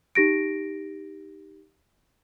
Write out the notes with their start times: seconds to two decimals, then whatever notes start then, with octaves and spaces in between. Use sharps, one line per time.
0.15 D#4 G4 A#6 D7